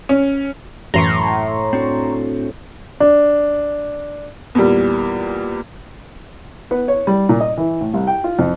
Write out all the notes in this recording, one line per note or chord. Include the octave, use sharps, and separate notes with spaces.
C#4
F#2 A2 E3 A#5 C6 C#6
C4 D4 F#4
D4
E2 A#2 G3
B3
C#5
G3
A#2
D#5
E3
A2
C2
G5
F4
F2